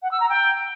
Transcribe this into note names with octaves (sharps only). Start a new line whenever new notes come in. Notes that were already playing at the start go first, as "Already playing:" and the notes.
F#5
E6
A#5
G5